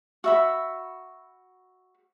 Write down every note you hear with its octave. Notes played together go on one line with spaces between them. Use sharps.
F#4 E5 B5